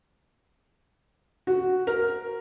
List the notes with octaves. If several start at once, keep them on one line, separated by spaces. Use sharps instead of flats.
F#4
A#4